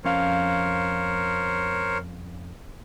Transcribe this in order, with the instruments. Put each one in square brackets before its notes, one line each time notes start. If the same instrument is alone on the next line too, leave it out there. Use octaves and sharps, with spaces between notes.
[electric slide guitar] F2 C#4 F5 [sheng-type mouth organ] A#4 C5 C#5